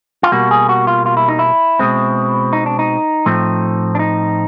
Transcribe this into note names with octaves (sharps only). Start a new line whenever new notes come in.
F4
B2 G3 A#3 F#4
G#4
F#4
F4
F4
E4
D#4
E4
B2 G#3 C4
D#4
D4
D#4
A2 F3 A3 C4
D4
D#4